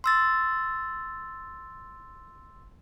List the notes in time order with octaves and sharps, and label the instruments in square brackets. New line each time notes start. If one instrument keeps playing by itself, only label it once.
[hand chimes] C6 E6 A6